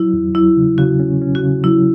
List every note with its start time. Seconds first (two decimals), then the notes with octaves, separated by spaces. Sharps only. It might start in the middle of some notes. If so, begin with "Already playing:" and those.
Already playing: F#3 E4
0.13 E2
0.35 F#3 E4
0.56 C#3
0.78 C#3 F#4
1.00 C#4
1.21 C#4
1.35 F#4
1.43 C#3
1.64 F#3 E4